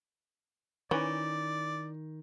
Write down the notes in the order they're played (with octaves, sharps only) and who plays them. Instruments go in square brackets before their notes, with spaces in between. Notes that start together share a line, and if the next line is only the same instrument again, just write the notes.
[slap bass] D#3 [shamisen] E3 C#4 [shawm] D5